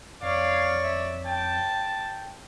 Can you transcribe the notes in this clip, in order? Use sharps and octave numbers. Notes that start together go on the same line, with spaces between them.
F2 C#5 D5 F5
E5
G5 A5